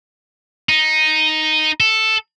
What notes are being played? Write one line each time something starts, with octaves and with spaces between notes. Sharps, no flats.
D#4
A4